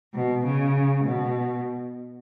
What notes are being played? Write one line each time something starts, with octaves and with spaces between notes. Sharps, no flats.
B2
C#3
B2